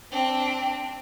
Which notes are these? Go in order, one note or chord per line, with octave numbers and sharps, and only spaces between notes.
C4 D4